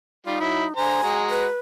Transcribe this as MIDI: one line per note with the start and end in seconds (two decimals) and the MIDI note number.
0.26 0.37 55
0.26 0.74 63
0.26 0.37 65
0.40 0.65 54
0.40 0.65 64
0.76 1.02 50
0.76 1.02 72
0.76 1.18 80
0.76 1.02 82
1.03 1.47 56
1.03 1.47 66
1.03 1.47 82
1.30 1.60 71